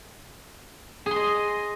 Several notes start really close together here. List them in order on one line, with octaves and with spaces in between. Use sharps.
G#4 C6 D#5